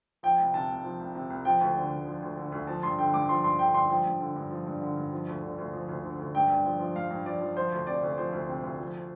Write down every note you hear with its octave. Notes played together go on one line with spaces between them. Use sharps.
F3 G5
C2
C3 A5
C2
F3
C2
C3
C2
F3 G5
D2
D3
D2
F3
D2
D3
D2
F3 A5
G2 C6
D3 G5
G2 D6
F3 C6
G2 C6
D3 G5
G2 C6
F3 G5
G2
D3
G2
F3
G2
D3
G2
F3
D2
D3
D2
F3
D2
D3
D2
G2 G5
G2
F3
F3
G2 F5
G2
F3 D5
F3
F3 C5
D2
C3 D5
D2
F3 C5
D2
C3
D2
F3